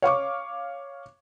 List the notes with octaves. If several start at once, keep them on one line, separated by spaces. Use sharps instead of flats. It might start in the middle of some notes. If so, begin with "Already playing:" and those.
C#5 F5 C#6 D6